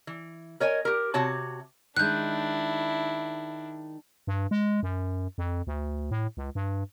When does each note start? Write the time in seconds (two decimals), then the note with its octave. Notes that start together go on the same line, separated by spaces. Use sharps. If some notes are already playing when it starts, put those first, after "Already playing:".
0.07 E3
0.60 A#4 C#5 D#5 G#5
0.85 G4 A#4
1.14 C3 F#4 C#5 A5
1.97 D#3 G#3 D4 E4 F#6 G6
4.27 G2
4.51 G#3
4.83 F#2
5.38 F2
5.67 D2
6.11 A2
6.37 C#2
6.55 G2